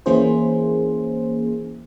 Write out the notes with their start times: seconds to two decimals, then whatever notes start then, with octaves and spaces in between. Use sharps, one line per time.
0.06 E3 A#3 C#4 E4 G#4 C5